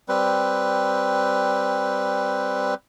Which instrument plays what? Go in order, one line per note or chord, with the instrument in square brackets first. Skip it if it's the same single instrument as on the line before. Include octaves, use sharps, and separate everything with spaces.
[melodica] G3 C4 B4